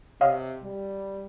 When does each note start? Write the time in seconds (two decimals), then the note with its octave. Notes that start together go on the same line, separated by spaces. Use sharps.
0.21 C3 C#5 D#5 F5
0.63 G3